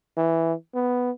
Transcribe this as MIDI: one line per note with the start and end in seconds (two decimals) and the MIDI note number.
0.17 0.53 52
0.75 1.11 59